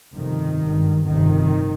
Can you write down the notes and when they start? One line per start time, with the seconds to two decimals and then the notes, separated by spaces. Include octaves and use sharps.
0.16 G1 F2 C3 D#3
0.62 G#1 G2
1.07 G1 F2 C3 D#3